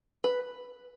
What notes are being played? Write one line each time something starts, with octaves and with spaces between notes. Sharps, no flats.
B4